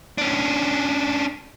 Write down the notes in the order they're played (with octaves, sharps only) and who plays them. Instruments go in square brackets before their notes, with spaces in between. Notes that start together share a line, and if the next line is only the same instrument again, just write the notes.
[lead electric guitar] C#4 D4